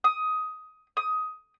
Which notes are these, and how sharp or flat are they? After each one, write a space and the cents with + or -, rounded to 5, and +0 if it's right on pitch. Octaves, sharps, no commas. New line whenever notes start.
D#6 +15
D#6 +15